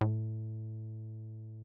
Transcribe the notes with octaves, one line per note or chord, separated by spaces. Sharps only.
A2